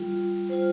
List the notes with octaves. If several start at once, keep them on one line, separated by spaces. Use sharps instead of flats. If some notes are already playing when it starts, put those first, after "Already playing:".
Already playing: G3 F4
G3 F4 C5